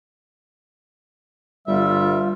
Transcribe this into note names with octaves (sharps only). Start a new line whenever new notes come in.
G1 G3 F4 E5